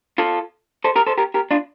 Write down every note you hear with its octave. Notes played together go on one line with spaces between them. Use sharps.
F4 A4
A4 C5
G4 A#4
A4 C5
G4 A#4
G4 A#4
D4 F4